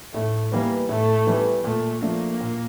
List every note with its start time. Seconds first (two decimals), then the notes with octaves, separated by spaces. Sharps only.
0.13 A2 A3
0.52 E3 G3 A#3 B3
0.89 A2 A3
1.27 E3 G3 B3
1.64 A#2 A3
2.02 F3 A3 A#3 D4
2.41 A#2